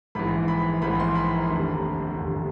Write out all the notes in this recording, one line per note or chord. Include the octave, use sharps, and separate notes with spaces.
A#1 G#2 E3 B5
B5
A#1 G#2 E3 B5
C6
B5
A#5
F1 D#2 D3
F1 D#2 D3